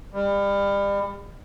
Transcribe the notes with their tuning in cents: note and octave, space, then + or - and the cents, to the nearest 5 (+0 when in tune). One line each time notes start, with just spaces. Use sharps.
G3 +30